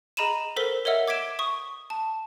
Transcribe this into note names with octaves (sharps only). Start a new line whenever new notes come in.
G#4 D#5 A#5 B5 D#7 E7
A4 A#4 C5 E6 B6 G7
A#4 C#5 D#5 E5 F#5 E6
D6 G#6 B6 D7 E7
C#6 D#6
A5